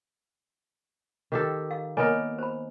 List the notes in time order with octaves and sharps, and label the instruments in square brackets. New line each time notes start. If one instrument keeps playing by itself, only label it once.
[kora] D#3 G4 A4
[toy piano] F5
[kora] A#3 B3 A#4 [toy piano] C#5 D#5 G#5
[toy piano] C5 B5